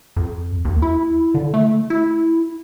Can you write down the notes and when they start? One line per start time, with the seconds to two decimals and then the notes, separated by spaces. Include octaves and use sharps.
0.16 F2
0.65 D#2
0.82 E4
1.34 D3
1.54 A3
1.90 E4